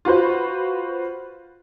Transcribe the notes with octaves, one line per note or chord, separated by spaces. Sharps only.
F4 F#4 B4 C5